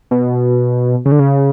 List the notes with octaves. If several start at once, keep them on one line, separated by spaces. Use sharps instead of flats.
B2
C#3
D3
C#3